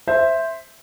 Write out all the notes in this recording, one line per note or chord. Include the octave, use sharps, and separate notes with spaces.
C5 E5